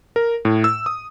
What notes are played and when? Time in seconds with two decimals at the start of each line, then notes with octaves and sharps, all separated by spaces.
0.16 A#4
0.45 A2
0.64 E6
0.86 D#6